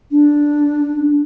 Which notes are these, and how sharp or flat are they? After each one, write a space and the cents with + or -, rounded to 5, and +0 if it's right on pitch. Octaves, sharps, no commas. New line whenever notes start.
D4 +0